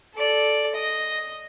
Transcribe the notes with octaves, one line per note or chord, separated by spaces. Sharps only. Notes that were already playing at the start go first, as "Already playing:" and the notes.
A4 D5
D#5